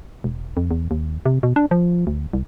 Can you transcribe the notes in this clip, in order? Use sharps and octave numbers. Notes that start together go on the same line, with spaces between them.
E1
F2
E2
D#2
C3
B2
D4
F3
D2
C2